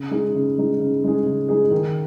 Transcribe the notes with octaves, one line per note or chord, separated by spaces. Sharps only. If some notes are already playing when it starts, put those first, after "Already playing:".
Already playing: C#3
G#3 D#4 G#4
C#3
G#3 D#4 G#4
C#3
G#3 D#4 G#4
C#3
G#3 D#4 G#4
D#3